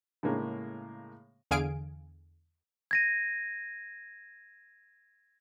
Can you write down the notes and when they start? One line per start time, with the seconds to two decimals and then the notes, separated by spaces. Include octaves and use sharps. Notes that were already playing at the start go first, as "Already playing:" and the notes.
0.23 A2 C#3 G#3 A#3
1.51 E2 D3 G#4 F5 G#5 D7
2.91 G#6 A#6 D#7